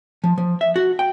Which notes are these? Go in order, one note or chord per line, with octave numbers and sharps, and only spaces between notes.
F3
F3
E5
F#4
G5